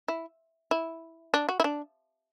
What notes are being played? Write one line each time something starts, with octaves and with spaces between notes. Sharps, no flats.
E4
E4
D4
F#4
E4
D4